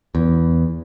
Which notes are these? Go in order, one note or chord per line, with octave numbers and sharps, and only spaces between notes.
E2